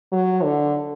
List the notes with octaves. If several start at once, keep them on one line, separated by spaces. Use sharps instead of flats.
F#3
D3